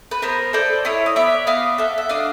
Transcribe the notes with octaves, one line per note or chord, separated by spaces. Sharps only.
B4
B3 A#4 C5
A4 C5 D5
E4 C#5 D#5
D#5
B3 D5 E5
B3 D#5 F5
A4 E5 F#5
E5
D4 D#5 F5